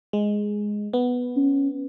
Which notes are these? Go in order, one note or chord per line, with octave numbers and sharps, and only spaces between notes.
G#3
B3
C#4